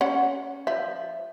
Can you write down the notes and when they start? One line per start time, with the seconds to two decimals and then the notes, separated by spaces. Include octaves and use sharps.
0.01 C#4 F#5
0.67 F3 E5